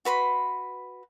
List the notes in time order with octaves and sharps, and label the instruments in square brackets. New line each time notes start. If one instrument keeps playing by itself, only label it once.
[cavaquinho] F#4 B4 B5 C6